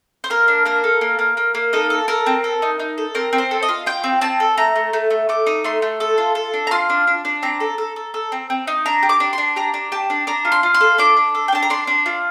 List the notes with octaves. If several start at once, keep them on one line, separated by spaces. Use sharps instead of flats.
C5
A#3 A#4
D4
A#3 A#4
A4
A#3
A#3
A#3
A#3
D#4 A4
A4
A4 A#4
C4
A4
D#4
D#4
A4
C4 A#4
C4
C5
A4
D#5
F4
F4 G5
C4
C4 A5
A4
A3 A#5
A3
A3
A3
A3 D6
D#4
A3 C6
A3
A4
F4
A4
D4
A#5
F4 C6
D4
D4
D4
C4 A#5
A4
A4
A4
A4
C4
C4
D#4
D4 A#5
G4
D6
D4
D4 C6
G4 A#5
D4
G4 A5
D4
D4 A#5
F4
C6
F4
C6
A4
D4 D6
D4
A4
G5
D4 A5
A#5
D4 C6
D4
F4